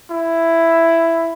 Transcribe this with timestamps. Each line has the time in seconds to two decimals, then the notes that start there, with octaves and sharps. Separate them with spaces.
0.11 E4